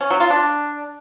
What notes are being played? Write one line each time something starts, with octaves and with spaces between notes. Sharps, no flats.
C#4
F#3
F4
D4